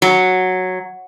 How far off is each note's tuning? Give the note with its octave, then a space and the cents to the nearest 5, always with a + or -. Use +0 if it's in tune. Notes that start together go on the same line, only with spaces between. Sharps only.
F#3 -5